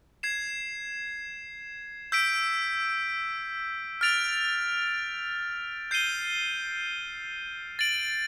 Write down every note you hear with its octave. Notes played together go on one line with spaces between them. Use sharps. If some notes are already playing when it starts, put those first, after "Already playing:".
G#6 C7 E7
E6 G6 B6 D7
F6 A6 D7 F7
G6 C7 D#7 G7
A6 D7 F#7